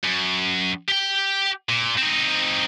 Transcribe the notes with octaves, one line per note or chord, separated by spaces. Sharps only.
F#2
G4 G5
A#2
C4 D#4